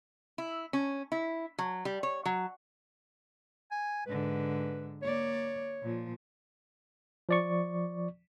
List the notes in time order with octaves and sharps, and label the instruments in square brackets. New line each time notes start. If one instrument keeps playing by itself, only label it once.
[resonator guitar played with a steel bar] E4
C#4
E4
F#3
G3
C#5
F#3
[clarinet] G#5
[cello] G#2 D3 [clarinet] B4
[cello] A#3 D5 [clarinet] C#5
[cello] A#2 F3
[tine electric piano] F3 D5 C#6